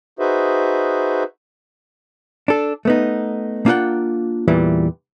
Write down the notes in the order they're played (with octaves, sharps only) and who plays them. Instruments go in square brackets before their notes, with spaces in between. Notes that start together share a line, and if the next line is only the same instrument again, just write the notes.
[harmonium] D#4 F#4 G#4 B4 C5 E5
[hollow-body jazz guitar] D4 A4
A3 B3 D#4
A#3 D4 F4 A4 F#5 G5
E2 A#2 E3 G3